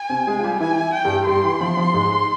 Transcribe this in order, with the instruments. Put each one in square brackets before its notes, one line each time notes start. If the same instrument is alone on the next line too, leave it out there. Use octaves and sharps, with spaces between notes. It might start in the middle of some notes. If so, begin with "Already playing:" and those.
Already playing: [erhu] G#5
[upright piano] C3 C4
G#3 G#4
F4
G3 G4
[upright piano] E3 E4 [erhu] G#5
[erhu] G5
[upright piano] G2 G3
[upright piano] G2 G3 [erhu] C6
[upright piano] E3
F3
F3
G#2 G#3